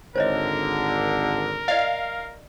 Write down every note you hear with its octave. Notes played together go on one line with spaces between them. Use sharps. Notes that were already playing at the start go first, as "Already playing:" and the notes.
G#1 D3 A#4 C5 C#5 D#5
D5 D#5 F5